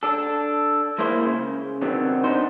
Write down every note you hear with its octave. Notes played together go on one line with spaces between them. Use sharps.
D4 A4
G#3 A#3 E4 C5
C#3
C3 D#3 F#3 B3 C4 D4
B3 D4 D#4 C5